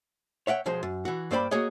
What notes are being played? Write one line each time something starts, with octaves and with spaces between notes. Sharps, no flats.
C#5 E5 F#5 G5
B1 F3 G#3 C5
F#2
E3 F#4
G2 A#3 C5 D5 G5 B5
A#3 F#4 G#4 C#5 D#5